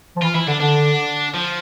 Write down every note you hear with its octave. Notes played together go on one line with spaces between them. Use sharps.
F3
E3 F4
E3 E4
D3 D4
D3 D4
F3